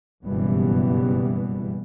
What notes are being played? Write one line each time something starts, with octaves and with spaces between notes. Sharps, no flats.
F#1 G2 B2 E3 G3 B3